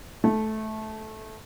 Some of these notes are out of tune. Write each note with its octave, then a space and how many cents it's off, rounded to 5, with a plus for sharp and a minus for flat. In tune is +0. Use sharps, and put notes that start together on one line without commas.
A3 -15